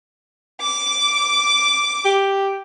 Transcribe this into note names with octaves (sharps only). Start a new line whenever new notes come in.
D6
G4